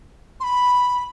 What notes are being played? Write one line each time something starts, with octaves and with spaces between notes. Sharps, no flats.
C6
B5